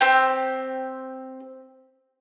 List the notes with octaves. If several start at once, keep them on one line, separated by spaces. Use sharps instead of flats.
C4 G4 G5